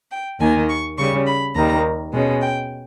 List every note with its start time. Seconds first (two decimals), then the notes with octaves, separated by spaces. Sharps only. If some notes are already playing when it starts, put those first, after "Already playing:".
0.12 G5
0.40 D#2 D#3 A#3 D#4 G#5
0.69 C#6
0.98 C#3 G3 C#4 C#6
1.27 B5
1.56 D#2 D#3 G3 A#5
2.13 B2 G#3 C#4
2.42 G5